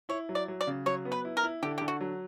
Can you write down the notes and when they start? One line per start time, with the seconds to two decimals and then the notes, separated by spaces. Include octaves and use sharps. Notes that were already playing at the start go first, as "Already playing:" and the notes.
0.09 E4 C#5
0.29 F#3
0.35 D5
0.48 F#3
0.61 D5
0.67 C#3
0.86 F#3 C#5
1.05 B3
1.12 B4
1.25 E4
1.37 A#4
1.43 E4
1.63 D3 G4
1.78 D3 G4
1.88 F#4
2.01 F#3